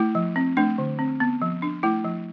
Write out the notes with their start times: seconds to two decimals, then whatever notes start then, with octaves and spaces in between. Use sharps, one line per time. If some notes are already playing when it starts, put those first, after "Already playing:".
Already playing: A3 E4
0.15 F3
0.36 C4
0.57 A3 D4
0.78 D3
0.99 C4
1.20 B3
1.42 F3
1.62 D4
1.83 A3 E4
2.05 F3